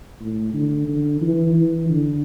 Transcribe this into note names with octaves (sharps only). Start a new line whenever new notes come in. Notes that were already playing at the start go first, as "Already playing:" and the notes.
A2
D3
D3
E3
E3
D3